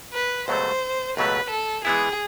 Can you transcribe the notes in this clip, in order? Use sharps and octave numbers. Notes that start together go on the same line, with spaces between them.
B4
C#2 B2 F#3 A3 C5
C#2 B2 F#3 A3 B4
A4
E3 G#3 B3 E4 G#4